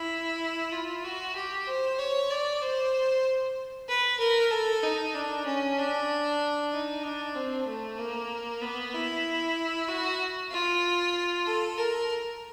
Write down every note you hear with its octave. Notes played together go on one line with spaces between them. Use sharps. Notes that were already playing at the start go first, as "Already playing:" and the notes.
Already playing: E4
F4
F#4
G4
C5
C#5
D5
C5
B4
A#4
A4
D#4
D4
C#4
D4
D#4
D4
C4
A3
A#3
B3
E4
F#4
F4
A4
A#4